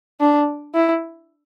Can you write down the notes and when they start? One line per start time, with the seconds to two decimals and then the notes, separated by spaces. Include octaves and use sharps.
0.20 D4
0.74 E4